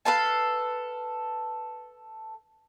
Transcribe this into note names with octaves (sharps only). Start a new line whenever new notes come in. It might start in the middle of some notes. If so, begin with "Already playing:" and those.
A4 B4 F5 A5